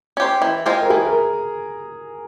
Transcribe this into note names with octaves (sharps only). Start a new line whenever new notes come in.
C#4 G4 C5
E3
G#3 C4 F4 C5
A#4
E3 G#4
A#4